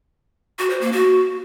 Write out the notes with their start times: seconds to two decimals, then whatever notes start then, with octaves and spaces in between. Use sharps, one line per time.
0.59 F#4
0.70 C5
0.81 A#3
0.92 F#4